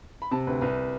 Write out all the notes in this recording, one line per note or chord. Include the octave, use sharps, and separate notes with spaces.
B5
C3 A5
D2 B4
C2 B4